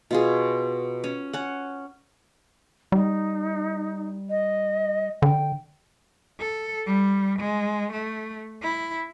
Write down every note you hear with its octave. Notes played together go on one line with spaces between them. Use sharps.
B2 F4 G#4
C#4
C#4 F#5
G3 D#4
D#5
D3 G5
A4
G3
G#3
A3
E4